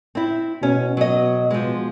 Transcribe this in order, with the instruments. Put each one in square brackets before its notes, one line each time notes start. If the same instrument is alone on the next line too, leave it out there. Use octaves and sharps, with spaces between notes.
[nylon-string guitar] C4 E4
[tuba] B2 [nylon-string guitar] C#4
[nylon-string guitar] F#3 D#5
F3 G#3